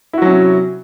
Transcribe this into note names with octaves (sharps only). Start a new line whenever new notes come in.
C3 F#3 C#4 E4 F#4